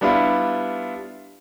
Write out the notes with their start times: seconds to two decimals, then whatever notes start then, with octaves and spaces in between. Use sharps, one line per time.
0.01 G3 B3 D4 E4 F4